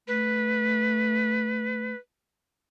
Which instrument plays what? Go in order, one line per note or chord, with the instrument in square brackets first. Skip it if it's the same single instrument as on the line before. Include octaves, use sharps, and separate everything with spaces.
[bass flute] A3 [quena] B4